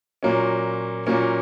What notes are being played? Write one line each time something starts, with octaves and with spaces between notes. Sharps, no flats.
A#2 F#3 A#3 C#4
A#2 F#3 A#3 C#4